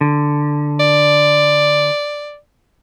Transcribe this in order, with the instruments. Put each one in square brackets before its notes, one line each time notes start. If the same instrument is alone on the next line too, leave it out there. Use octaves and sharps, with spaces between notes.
[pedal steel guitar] D3
[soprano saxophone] D5